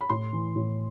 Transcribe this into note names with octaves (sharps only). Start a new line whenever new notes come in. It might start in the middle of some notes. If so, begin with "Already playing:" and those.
B5
A2 C6
E3
A2